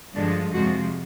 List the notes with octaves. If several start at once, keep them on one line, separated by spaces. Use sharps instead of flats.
G2 D3 F3 G#3 D4
F2 C3 F3 G#3 F#4